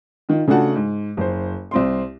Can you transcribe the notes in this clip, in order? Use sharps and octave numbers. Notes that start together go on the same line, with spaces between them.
D#3 F4
C#3 A3 D4 F#4 F#5 A5
G#2
F#1 C5
C2 C4 C6